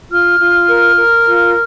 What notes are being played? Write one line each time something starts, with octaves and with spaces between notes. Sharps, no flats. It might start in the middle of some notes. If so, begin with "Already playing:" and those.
F4 F6
F4
A#4
A#4
F4